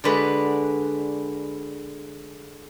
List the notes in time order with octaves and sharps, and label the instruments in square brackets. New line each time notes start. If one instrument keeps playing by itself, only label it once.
[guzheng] D3 G#3 [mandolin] F#4 B4 D5